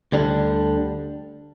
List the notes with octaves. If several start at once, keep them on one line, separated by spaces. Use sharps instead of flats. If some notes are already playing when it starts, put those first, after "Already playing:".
D2 D3 G3 D4